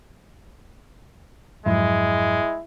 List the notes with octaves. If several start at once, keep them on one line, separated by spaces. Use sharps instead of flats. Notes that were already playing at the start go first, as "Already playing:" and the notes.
F2 G#2 F#3 G#3 E4